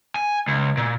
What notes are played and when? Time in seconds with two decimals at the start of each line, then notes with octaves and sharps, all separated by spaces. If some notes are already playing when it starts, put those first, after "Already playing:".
0.16 G#5
0.48 C#2
0.77 A#2